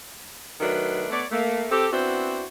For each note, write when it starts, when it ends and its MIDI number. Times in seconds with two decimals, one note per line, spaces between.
0.60 1.06 51
0.60 1.06 54
0.60 1.06 57
0.60 1.06 62
0.60 1.06 71
1.10 1.24 57
1.10 1.24 59
1.10 1.24 73
1.10 1.24 74
1.31 1.65 57
1.31 1.65 58
1.70 1.86 60
1.70 1.86 67
1.70 1.86 69
1.91 2.43 59
1.91 2.43 60
1.91 2.43 62
1.91 2.43 64
1.91 2.43 66
1.91 2.43 72